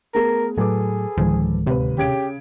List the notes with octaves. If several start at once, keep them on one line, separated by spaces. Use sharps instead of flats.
A3 B3 G#4 A#4
A2 F#3 G#4 A4 B4 D6
D1 D#3 F3 G#3
D#2 C3 B4
C#3 G4 G#6 D7